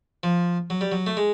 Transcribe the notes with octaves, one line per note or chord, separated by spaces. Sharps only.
F3
F#3
G3
F#3
A3
G#3